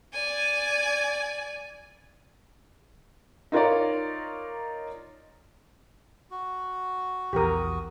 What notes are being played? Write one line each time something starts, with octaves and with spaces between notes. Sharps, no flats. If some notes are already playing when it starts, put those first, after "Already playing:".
D5 G#5
D#4 F4 A#4 C#5 D5
F#4
A#1 E2 G4 A#4 D#6